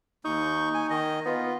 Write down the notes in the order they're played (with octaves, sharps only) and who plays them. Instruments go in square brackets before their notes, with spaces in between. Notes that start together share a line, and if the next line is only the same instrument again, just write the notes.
[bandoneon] D#2 C#6 G6 [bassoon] D#4
[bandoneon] G#5
D#3 D#5
[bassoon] B3 [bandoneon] F4